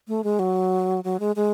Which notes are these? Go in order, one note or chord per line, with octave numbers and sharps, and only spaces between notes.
A3
G#3
F#3
F#3
G#3
G#3